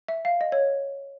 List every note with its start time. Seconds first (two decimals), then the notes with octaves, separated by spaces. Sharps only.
0.08 E5
0.25 F5
0.41 D#5
0.52 C#5